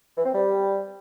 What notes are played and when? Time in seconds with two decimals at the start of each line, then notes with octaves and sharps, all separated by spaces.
0.17 E3
0.26 C4
0.34 G3